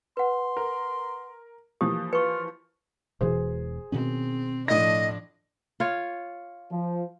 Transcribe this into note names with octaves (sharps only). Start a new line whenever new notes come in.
B4 F#5 C6
A#4
E3 F3 A#3 G4 D#6
F4 B4 C#6 C#7
E1 B2 E3 G#4 C5
B2 D#3 C4 C#4
A2 F3 D4 D#5 A#6
F4 C#5
F3